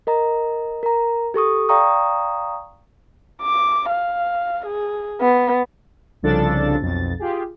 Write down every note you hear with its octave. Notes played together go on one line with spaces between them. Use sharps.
A#4 D#5 A#5
A#4 A#5
G4 A4 C#6 D#6
D5 F5 G5 A#5 C#6 D#6
D6
F5
G#4
B3
C2 C#3 F3 D4 A4 A6
B1 F2 A6
F4 G4 G#4